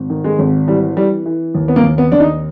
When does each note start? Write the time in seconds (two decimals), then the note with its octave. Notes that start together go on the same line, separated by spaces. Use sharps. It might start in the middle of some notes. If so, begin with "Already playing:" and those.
Already playing: G#1
0.10 D#3
0.24 G#3
0.39 G#1
0.67 E3 G3
0.96 E3 G3
1.26 E3
1.55 D#2
1.68 B3
1.76 A#3
1.83 D#2
1.98 B3
2.12 D#2 D4
2.20 D#4